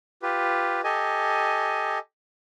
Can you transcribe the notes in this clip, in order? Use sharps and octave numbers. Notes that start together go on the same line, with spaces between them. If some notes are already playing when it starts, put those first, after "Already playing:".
F4 G4 B4
G4 A4 D#5 G#5